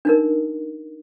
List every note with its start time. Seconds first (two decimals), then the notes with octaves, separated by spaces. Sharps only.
0.05 D4 D#4 A#4